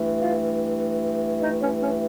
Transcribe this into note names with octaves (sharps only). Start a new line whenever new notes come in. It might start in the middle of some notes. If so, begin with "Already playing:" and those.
Already playing: G2 E3 A3
F4 F5
D#4 D#5
C#4 C#5
C#4 C#5